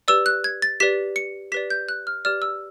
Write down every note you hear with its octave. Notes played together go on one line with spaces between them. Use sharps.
G4 B4 D5 E6
F#6
G#6
A6
G4 B4 D5 B6
C#7
G4 B4 D5 B6
G6
F#6
F6
G4 B4 D5 F6
E6